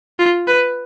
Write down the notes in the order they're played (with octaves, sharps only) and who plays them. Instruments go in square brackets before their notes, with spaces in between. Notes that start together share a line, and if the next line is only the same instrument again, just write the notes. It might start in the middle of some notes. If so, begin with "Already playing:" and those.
[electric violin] F4
B4